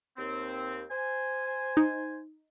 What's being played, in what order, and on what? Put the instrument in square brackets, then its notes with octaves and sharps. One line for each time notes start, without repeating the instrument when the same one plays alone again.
[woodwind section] D#2 C4
C5 G#5
[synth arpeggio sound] D#4